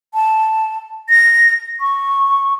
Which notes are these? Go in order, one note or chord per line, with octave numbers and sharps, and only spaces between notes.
A5
A#6
C#6